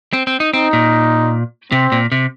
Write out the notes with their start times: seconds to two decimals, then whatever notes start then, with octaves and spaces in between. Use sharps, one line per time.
0.13 C4
0.27 C4
0.40 D#4
0.53 C4 D#4
0.73 A#2
1.72 C3 C4
1.92 A#2
2.12 C3